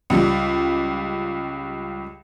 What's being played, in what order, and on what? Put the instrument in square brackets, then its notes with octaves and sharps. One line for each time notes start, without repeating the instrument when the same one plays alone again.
[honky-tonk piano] C#2 G3